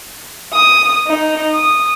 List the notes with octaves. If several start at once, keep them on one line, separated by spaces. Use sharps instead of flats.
D#6
D#4
D#6